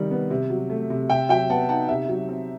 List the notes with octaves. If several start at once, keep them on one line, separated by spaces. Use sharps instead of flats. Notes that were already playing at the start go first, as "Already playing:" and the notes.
Already playing: C3 D#3 G3
B3
C3
F#3
A3
C3
C3 E5 G5
F#3 E5 G5
B3 F#5 A5
D#4 F#5 A5
C3 E5
F#3
C4